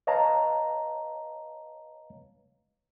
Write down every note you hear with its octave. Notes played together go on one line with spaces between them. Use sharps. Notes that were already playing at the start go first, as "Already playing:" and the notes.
B4 C#5 D#5 F5 A5 A#5